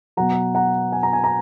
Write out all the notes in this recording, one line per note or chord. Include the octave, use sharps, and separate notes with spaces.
B2 F#3 F#5 A#5
F#5 A#5
G#5
A#5
G#5
A#5